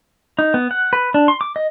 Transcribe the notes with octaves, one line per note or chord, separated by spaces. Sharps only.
D#4
B3
F#5
B4
D4
C6
D6
D#5